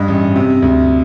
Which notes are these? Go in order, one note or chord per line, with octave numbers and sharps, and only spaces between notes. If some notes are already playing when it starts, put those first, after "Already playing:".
Already playing: G2 D#5
A1
C3
D2